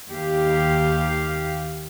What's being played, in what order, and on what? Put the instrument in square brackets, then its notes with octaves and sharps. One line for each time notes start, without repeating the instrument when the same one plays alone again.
[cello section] D#2 G4 F5